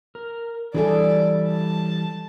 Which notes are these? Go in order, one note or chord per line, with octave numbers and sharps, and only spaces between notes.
A#4
E3 G3 D4 G#4 A4 D5
A5